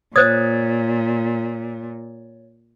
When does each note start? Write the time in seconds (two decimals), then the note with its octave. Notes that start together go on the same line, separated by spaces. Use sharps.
0.16 A#2 C5 C#5 D#6 G#6 A6